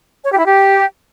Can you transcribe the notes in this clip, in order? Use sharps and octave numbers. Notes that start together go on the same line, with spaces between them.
C#5
G4
E4
G4